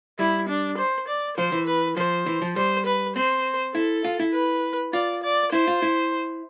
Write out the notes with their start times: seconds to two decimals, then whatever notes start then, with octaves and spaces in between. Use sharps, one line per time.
0.19 G3 E4
0.49 D4
0.78 C5
1.08 D5
1.37 F3 C5
1.52 E3
1.67 B4
1.97 F3 C5
2.26 E3
2.42 F3
2.56 G3 C5
2.86 B4
3.16 C4 C5
3.75 E4 A4
4.04 F4
4.20 E4
4.34 B4
4.93 F4 D5
5.23 D5
5.52 E4 C5
5.68 F4
5.82 E4